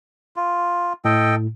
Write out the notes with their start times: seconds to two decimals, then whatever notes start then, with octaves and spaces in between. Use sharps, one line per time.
0.36 F4
1.05 A2 A4 D#5 G5